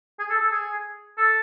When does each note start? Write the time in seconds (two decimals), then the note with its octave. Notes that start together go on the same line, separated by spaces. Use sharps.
0.19 G#4
0.30 A4
0.41 A4
0.52 G#4
1.17 A4